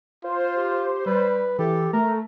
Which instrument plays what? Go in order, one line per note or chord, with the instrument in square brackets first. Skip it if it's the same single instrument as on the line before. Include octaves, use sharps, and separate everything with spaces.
[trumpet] F4 [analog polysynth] C5
[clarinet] G4
[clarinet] G3 [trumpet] B4
[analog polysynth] E3 [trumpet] G4 [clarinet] A4
[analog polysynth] A3 [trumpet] A#4 [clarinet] A#5